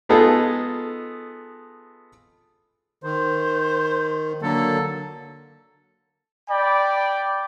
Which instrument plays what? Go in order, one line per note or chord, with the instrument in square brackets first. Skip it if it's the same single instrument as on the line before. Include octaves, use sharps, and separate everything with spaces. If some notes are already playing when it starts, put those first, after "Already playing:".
[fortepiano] G#3 B3 D#4 F4 G#4 A4
[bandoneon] D#3 [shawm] C5
[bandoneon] D3 F#3 A#3 [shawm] A4
[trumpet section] D5 G5 B5